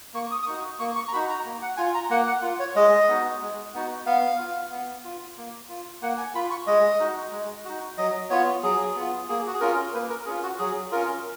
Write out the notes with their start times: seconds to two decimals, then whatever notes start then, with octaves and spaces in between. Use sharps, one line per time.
0.14 A#3 C#6
0.31 D#6
0.43 D#6
0.46 D#4 F#4 C#6
0.79 A#3 C#6
0.96 C#6
1.08 A#5
1.13 D#4 F#4 B5
1.29 A#5
1.45 A#3
1.62 F#5
1.77 F4 G#5
1.95 A#5
2.10 A#3 F#5
2.27 F#5
2.42 F4
2.59 C#5
2.76 G#3 D#5
3.08 B3 D#4 F#4
3.41 G#3
3.74 B3 D#4 F#4
4.06 B3 F5
4.39 F4
4.71 B3
5.05 F4
5.37 A#3
5.69 F4
6.02 A#3 F#5
6.18 G#5
6.35 F4 B5
6.50 C#6
6.67 G#3 D#5
7.00 D#4 F#4
7.32 G#3
7.65 D#4 F#4
7.97 F#3 D#5
8.30 B3 F4 C#5
8.63 F#3 G#4
8.95 B3 F4
9.29 A#3 G#4
9.47 F#4
9.54 G#4
9.60 C#4 F4 A#4
9.94 A#3 B4
10.09 A#4
10.26 C#4 F4 G#4
10.43 F#4
10.59 F#3 G#4
10.92 C#4 F4 A#4